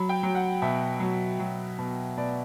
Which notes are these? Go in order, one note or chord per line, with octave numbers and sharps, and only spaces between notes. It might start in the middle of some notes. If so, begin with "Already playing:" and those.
Already playing: F#3 B5
G5
F#3
F#5
B2 E5
F#3
F#3
B2
B2 D5